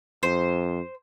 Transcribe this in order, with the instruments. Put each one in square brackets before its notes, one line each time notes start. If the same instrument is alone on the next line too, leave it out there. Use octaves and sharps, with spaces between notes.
[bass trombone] F2 [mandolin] C5